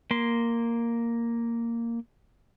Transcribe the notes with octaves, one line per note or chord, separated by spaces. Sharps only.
A#3 C6